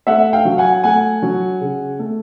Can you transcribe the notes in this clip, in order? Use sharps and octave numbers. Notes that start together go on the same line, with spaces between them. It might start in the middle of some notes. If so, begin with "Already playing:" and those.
A3 E5 F#5
F5 G5
F#3
F#5 G#5
A3 F#5 G#5
F#3
C#3
A3